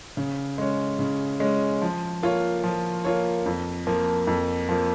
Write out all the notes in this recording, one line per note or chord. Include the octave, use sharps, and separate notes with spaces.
C#3
G#3 C#4
C#3
G#3 C#4
F3
A#3 F4 C#5
F3
A#3 F4 C#5
F2
F3 A#3
F2
F3 A#3